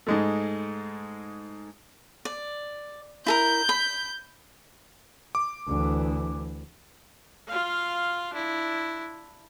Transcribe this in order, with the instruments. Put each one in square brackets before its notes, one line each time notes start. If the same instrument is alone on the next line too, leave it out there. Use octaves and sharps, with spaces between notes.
[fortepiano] G#2 G#3 A3
[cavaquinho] D5
[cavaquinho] E4 A4 A#4 [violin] G6
[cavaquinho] B5
[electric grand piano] D6
[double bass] D2 E3
[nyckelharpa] F4 F5
D4 E4